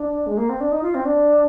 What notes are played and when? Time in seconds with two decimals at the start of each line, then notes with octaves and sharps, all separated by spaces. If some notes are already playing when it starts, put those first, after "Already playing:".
Already playing: D4
0.26 G#3
0.37 A#3
0.49 C4
0.60 D4
0.72 D#4
0.82 F4
0.95 C4
1.05 D4